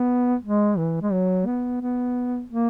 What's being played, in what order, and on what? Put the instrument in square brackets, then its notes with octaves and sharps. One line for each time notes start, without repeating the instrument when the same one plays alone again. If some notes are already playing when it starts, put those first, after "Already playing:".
Already playing: [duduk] B3
G#3
E3
G#3
F#3
B3
B3
A#3